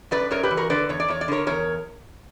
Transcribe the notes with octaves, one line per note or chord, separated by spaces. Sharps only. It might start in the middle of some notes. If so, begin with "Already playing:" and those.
F#2 B4 D5
F#2 A#4 C#5
G4 B4
E3
F#4 A#4
D3 B4 D5
E2 C#5
D5
E2 C#5
D5
D3 A#4 C#5
E2 A#4 C#5